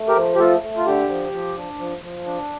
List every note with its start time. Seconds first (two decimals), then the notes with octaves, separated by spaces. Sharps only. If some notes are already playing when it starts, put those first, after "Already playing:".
Already playing: A3
0.08 G4 A#4
0.16 F3
0.35 G4
0.39 A3 F4 A4
0.63 A3
0.77 F4
0.86 D3 G4
1.09 F3
1.33 F3
1.56 D4
1.79 F3
2.02 F3
2.26 D4